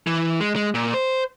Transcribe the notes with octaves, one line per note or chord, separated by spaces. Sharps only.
E3
G#3
G#3
A#2
C5